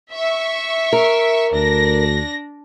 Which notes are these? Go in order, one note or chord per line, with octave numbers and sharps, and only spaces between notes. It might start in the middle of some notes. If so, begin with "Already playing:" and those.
E5 C#6
A#4
D2 D4 A#6